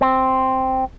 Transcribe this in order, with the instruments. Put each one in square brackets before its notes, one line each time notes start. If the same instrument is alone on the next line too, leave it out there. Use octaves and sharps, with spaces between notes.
[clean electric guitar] C4